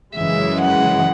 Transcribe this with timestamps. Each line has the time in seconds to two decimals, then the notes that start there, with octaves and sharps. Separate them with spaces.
0.14 F#2 C#3 E3 G#3 E5
0.61 F#5